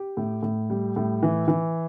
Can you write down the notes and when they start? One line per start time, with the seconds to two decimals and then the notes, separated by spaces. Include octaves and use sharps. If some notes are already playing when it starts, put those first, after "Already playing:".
Already playing: G4
0.17 A2
0.43 A2
0.70 G3
0.96 A2
1.23 E3
1.48 E3